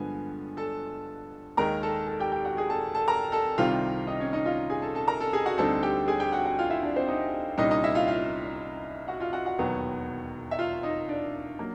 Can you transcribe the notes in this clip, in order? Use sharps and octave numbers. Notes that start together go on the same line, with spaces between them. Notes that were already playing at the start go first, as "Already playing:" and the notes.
Already playing: G2 D3 F3 G#3 B3 G#5
A4 A5
D#2 D#3 G#3 A#4 A#5
A4 A5
A4 A5
G4 G5
G4 G5
F#4 F#5
G#4 G#5
A4 A5
A4 A5
A#4 A#5
A4 A5
C2 C3 D#3 G3 C4 F4 F5
D#4 D#5
C#4 C#5
D#4 D#5
F4 F5
G#4 G#5
A4 A5
A4 A5
A#4 A#5
A4 A5
G#4 G#5
F#4 F#5
D2 D3 G3 C4 D#4 A4 A5
G4 G5
G#4 G#5
G4 G5
F#4 F#5
F#4 F#5
F4 F5
E4 E5
D4 D5
C4 C5
D#4 D#5
C2 A#2 G3 A#3 C#4 D#4 D#5
D#4 D#5
E4 E5
F4 F5
F4 F5
F#4 F#5
F4 F5
F#4 F#5
F#4 F#5
E1 D#2 D#3 F#3 B3
E5
F4 F5
D#4 D#5
D4 D5
F#3 A#3